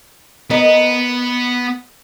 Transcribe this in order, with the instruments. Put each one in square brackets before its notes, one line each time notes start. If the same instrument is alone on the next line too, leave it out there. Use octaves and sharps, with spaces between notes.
[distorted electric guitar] B3 [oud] A#4 D#5